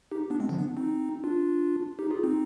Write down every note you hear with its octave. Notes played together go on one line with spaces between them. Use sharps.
D#4 G4
B3 D4
G#3 C4
D3 F3
B3 D4
C4 D#4
D4 F4
D#4 G4
F4 G#4
C4 D#4